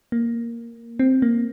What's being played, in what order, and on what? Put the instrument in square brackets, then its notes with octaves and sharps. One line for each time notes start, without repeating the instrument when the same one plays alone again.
[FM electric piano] A#3
C4
A#3